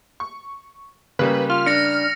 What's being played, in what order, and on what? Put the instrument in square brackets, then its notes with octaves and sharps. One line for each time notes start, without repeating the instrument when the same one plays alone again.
[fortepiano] C#6
[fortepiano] C#3 G3 A#3 [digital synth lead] B4
[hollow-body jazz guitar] F4 [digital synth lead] F6
[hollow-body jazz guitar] D4 [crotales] A#6 C#7